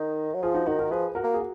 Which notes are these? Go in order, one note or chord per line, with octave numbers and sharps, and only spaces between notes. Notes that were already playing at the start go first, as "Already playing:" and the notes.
Already playing: D#3 D#4
F#3
F3 F4 G#4
D#4 F#4
D#3 D#4 F#4
F#4 A#4
F3 G#4 B4
F#4 A#4
A#3
G#4
F#4